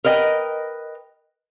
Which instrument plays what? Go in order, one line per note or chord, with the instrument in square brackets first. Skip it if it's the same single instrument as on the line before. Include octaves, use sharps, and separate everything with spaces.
[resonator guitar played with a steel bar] A#4 B4 D#5 G5